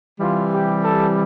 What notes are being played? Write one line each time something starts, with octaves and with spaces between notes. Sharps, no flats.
C3 E3 G3 F4
G4
A4